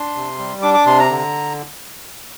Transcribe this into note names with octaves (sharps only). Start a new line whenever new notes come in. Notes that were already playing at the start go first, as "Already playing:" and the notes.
Already playing: D4 C6
C3
G3
D4 D6
D6
C3 C6
A#5
D3